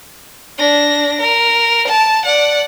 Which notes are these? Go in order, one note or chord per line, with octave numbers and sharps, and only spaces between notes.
D4 A#6
A#4
A5
D5 F#5